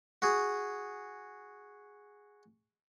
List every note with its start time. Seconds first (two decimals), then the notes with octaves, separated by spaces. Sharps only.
0.22 F#4 G#4